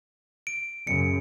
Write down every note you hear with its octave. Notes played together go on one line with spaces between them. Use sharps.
D7
F#2 C#3 C#7